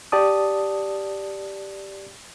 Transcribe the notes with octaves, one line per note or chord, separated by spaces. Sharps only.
G4 D5 A5 D#6